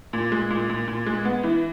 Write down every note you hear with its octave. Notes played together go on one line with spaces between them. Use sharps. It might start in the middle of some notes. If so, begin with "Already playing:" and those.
A#2
G#3
A#2
A#2
A#2
G#3
B3
E3